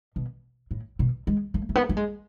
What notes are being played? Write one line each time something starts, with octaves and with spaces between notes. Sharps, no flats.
B2
A2
B2
G#3
A3
A3
B3
A3
G#3